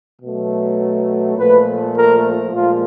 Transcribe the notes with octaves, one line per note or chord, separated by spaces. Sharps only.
B2 F#3 A3
A#2 F3 A3 B4
A#4
A#2 F3 G#3 F4